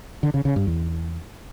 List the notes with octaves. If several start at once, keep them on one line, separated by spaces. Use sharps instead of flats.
D3
C#3
C#3
G2
E2